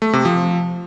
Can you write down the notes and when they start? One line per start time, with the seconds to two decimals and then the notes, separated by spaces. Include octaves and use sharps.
0.02 A3
0.13 C3
0.25 F3